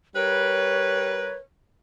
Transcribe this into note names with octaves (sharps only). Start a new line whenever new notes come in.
G3 A#4 B4 C#5